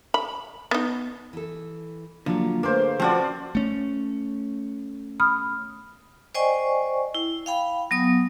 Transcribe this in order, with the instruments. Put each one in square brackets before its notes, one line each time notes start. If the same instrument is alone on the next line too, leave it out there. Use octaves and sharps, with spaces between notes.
[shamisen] B5
B3 D#4
[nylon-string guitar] E3 A4
[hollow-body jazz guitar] D3 [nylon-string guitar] F3 F#3 [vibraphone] A#3
[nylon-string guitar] A3 G#4 [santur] A#3 C5 [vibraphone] B4 F5
[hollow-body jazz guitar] F3 F#4 [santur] C4 F4 D5 [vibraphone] C#4 A5 C6
[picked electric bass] A3 C#4
[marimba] B5 D#6 F6
[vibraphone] C5 D5 D#5 G5 G#5 C#6
E4
F5 G5 B5
F#3 B3 D#6